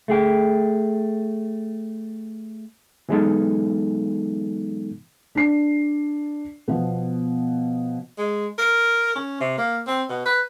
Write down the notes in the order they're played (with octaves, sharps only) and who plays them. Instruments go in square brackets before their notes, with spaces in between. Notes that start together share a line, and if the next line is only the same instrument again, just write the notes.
[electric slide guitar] A3 G#4 G5
[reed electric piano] E3 F#3 G#3 B3 D#4 A4
[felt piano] D4 C7
B2 F3 B3
[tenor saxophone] G#3
A#4
C#4
C3
A#3
C4
B2
B4